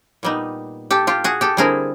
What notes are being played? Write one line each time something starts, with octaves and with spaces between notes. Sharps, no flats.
A#2 G3 B3 D#4
G4 A4
F4 G4
F#4 G#4
G4 A4
D3 G3 C4 E4 G#4 A#4